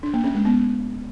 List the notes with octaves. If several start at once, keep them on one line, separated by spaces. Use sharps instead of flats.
D4
A#3
C#4
G#3
B3